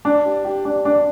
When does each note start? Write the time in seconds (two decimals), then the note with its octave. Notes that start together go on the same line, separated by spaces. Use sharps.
0.05 D4
0.25 G4
0.45 G4
0.65 D4
0.85 D4